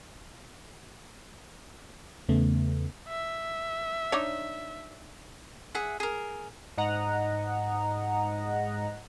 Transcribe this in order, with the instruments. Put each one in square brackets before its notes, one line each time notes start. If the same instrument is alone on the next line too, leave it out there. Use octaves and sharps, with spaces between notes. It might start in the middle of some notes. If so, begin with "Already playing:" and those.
[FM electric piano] E2 C#3 A3 B3
[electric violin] E5
[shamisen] D4 D#4 C#5
[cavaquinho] G#4 E5 F#5
G#4 A#4
[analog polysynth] G#2 D#5 F#5 A#5